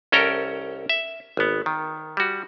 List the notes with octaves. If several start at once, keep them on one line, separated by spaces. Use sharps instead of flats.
C2 C#4 A4 A#4 G5 A#5
E5
G#1 B3
D#3
G3 F#4